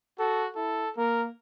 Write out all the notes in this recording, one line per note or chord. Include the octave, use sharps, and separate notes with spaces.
F#4 A4
E4 A4
A#3 A#4